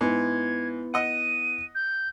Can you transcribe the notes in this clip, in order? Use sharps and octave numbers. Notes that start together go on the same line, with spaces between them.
G#2 B3 E4 G#6
D#5 F#5 D#7
G6